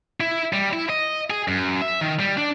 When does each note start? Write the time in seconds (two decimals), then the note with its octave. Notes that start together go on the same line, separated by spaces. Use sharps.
0.21 E4
0.53 G3
0.73 E4
0.90 D#5
1.30 G#4
1.48 F#2
1.82 E5
2.01 D#3
2.20 G3
2.38 D4